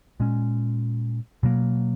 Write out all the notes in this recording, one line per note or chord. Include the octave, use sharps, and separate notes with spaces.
A#2 G#3 C#4
B2 F#3 A#3